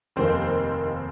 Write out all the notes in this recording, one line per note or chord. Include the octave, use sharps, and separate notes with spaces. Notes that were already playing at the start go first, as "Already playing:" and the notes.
F1 D#2 D#3 A#3 C4 C5